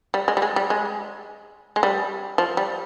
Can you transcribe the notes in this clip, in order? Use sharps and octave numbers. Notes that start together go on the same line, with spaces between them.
G3
G#3
G3
G#3
G3
G#3
G#3
G3
F3
G3